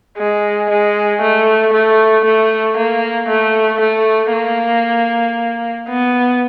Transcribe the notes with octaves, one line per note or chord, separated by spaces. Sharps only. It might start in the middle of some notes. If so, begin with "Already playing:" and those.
G#3
G#3
A3
A3
A3
A#3
A3
A3
A#3
B3